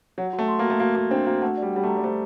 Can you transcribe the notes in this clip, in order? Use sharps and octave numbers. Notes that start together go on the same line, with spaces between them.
F#3 F#5
F#4
A3
C6
A#3
F#4
A3
A#3 F#4
A#3 F#4
C4 D4
A#3 F#4
A3 F#5
D5
G3
G3 F#5
A3
A#5
G3
A3 C5